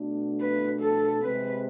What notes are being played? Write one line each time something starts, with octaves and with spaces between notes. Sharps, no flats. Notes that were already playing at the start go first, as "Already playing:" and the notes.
Already playing: B2 A3 D4
B4
A4
C3 G#3 C4 B4